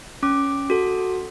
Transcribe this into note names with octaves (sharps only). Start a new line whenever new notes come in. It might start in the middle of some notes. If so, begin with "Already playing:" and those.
C#4 D6
F#4 A4